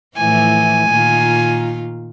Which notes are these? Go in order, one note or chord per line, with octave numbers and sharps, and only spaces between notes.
A2 E3 F3 G#5
A#2 D#3 F4